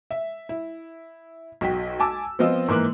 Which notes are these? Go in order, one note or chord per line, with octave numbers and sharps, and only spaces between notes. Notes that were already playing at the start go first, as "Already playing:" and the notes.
E5
E4
B1 F#4 G5 B6
G#5 A5 D6 E6
F3 B3 C4 F4 D#5 E6
G#2 E3 A#3 B4 D6 F#6